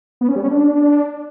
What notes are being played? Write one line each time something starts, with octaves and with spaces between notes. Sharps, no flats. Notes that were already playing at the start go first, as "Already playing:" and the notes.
B3
C#4
G3
C#4
D4